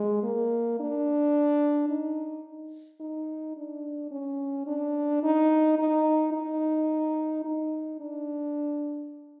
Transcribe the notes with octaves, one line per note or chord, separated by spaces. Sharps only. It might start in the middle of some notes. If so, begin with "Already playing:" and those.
Already playing: G#3
A#3
D4
D#4
D#4
D4
C#4
D4
D#4
D#4
D#4
D#4
D4